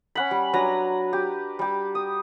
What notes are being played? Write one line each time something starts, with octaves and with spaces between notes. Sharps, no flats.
C#4 F#5 B5
G3
F#3 D4 B4 A#5
G4
G3 G4
D#6